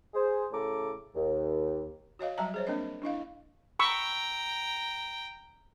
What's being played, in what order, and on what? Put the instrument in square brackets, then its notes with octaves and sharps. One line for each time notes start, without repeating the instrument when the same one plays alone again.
[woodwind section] G#4 C5
A2 C#3 A4 A#5 D6
D#2
[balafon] F#4 C#5 D#5 F5
F#3 G3 E5 G5 A5 A#5
G#4 C5 C#5
A#3 C4 D4 A#4 D#5
D4 E4 D#5 F5
[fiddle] G5 A#5 [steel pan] B5 C#6 E6